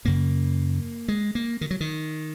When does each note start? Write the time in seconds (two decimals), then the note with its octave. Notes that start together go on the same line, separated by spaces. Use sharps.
0.05 F#1 F#2 C#3 A#3
1.08 G#3
1.35 A#3
1.61 D#3
1.71 F#3
1.80 D#3